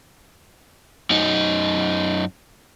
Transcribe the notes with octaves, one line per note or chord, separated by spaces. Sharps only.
F#2 D#4